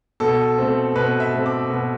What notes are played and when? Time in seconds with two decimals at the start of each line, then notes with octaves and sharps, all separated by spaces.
0.20 B2 A4
0.58 A3 C4
0.96 B2 B4
1.20 E5
1.33 A3 C4
1.46 D6
1.70 B2